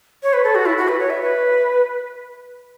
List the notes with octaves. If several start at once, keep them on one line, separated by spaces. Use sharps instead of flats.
C#5
B4
A4
F#4
E4
F#4
B4
C#5
E5
B4